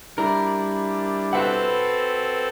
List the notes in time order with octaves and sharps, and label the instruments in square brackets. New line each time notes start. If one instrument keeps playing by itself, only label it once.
[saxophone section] G3 D4 E4 [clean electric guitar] A#4
[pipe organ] C4 A4 [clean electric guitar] F#4 B4 F#5